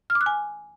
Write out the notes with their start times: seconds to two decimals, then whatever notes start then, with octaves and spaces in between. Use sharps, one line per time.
0.10 F6
0.15 D6
0.21 F#6
0.26 G#5